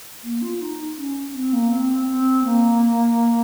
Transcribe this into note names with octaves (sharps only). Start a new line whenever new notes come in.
A#3
F4
D#4
C#4
C4
A#3
C4
C4
A#3